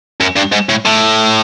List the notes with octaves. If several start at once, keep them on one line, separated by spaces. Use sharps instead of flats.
F#2
G2
G#2
A2
A2